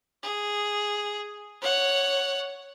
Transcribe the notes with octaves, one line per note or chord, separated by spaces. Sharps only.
G#4
C#5 F#5